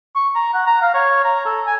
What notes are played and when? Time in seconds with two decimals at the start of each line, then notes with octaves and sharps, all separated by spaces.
0.16 C#6
0.35 A#5
0.54 F#5
0.67 A#5
0.82 F5
0.94 C#5
1.25 A#5
1.46 A4
1.66 G#5